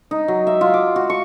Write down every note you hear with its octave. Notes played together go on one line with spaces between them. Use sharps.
D#4
F#3
E5
F4
D6
F#4
C#6